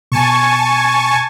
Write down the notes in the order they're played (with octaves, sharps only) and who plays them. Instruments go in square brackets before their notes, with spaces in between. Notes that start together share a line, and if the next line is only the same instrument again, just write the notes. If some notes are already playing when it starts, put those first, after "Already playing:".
[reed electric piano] B2 [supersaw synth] G#5 A5 C#6